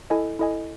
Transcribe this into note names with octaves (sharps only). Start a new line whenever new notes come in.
E4 A4 D#5 G#5
E4 A4 D#5 G#5